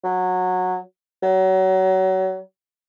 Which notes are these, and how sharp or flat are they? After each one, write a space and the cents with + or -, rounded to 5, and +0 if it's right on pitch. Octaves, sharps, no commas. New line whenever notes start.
F#3 -15
F#3 +30